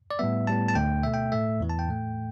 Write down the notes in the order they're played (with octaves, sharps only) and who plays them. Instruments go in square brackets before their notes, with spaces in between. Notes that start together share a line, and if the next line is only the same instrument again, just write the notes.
[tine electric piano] D5
A2 G3 B3 E5
A2 G3 B3 A5
A5
D2 D3 A3 G5
B2 A3 E5
G5
A2 A3 E5
E2 E3 B3
A5
G5
A2 A3